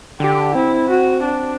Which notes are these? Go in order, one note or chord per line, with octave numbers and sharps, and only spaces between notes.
D3 G4
C4 E4
F#4
D4